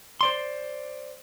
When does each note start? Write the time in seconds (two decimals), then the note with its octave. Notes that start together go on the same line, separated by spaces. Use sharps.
0.21 C5 D5 C6